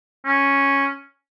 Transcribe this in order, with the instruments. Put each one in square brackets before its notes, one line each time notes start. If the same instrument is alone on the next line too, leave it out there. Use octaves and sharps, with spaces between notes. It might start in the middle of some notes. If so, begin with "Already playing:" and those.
[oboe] C#4